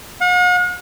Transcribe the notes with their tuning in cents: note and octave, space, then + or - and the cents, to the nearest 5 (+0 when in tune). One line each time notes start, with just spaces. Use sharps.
F#5 -45